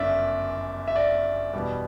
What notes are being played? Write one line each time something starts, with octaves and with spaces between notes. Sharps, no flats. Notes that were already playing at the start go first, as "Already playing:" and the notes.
Already playing: G1 F#2 C#3 D5 E5
E5
D5
E2 B2 G3